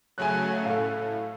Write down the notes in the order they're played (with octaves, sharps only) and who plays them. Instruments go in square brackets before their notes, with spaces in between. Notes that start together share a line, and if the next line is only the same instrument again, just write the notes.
[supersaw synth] C#3 F#3 A3 [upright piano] G#5 F#6
[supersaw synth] A2 [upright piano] A3 F5